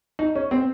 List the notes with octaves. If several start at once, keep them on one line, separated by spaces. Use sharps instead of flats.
D#4
C#4
C4